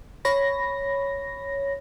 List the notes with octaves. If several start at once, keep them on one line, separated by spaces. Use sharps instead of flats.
C#5 B5 A#6